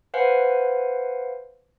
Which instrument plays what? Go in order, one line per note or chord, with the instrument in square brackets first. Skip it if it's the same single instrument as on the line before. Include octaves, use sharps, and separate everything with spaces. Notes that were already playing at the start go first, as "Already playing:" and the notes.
[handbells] B4 C5 F5 F#5 G#5